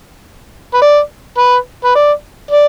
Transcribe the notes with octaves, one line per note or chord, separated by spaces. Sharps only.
B4
D5
B4
B4
D5
D5